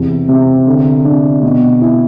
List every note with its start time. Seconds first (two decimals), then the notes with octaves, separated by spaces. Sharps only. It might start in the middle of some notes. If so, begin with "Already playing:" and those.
Already playing: E2 C3
0.28 C3
0.67 D3
1.05 D4
1.43 B2
1.82 E4